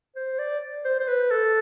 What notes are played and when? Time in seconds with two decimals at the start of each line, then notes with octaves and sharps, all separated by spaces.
0.16 C5
0.39 D5
0.85 C5
1.00 C5
1.08 B4
1.31 A4